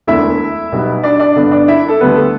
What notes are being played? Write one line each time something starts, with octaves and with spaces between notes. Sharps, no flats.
E1 D2 D3 B3 D4 E4 E5
B1 B2 G3 B3
D4 D5
D4 D5
G2 D3 B3 D4
D4 D5
E4 E5
A4
D2 D3 G3 B3 D4 B4
A4